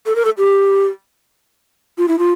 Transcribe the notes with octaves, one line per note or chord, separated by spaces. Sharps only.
A4
A#4
A4
G4
F4
E4
F4